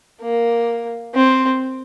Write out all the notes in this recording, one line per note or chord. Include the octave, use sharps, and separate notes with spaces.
A#3
C4